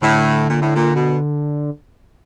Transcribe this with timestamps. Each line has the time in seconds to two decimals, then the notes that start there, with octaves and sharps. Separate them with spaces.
0.02 A2 D3
0.48 A#2
0.61 A2
0.75 A#2
0.95 B2